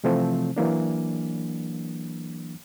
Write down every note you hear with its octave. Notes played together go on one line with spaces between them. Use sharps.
C3 E3 F3 A3 C4
E3 F#3 A#3 D4